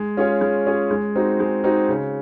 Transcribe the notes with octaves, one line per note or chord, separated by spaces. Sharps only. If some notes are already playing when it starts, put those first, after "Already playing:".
Already playing: G#3
C#4 F4 G#4 C#5
G#3
C#4 F4 G#4 C#5
G#3
C4 D#4 F#4
G#3
C4 D#4 F#4
C#3